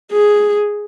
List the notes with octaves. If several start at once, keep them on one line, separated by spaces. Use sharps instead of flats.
G#4